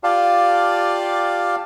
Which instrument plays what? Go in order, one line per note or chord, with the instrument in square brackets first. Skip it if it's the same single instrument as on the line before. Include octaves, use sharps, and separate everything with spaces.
[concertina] F4 G4 D5 F5 A5